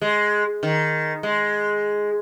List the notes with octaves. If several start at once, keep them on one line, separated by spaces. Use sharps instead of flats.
G#3
D#3
G#3